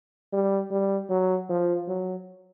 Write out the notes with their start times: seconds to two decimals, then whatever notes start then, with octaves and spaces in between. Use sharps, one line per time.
0.33 G3
0.71 G3
1.10 F#3
1.49 F3
1.88 F#3